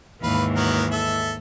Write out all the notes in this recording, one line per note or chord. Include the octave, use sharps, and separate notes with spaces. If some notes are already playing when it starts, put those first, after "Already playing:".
D#2 G#2 E3 B4 F5
F#3 B3 A#4
A4 E5